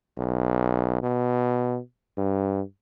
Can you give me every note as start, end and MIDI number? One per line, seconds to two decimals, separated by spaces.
0.17 0.99 35
1.03 1.78 47
2.17 2.61 43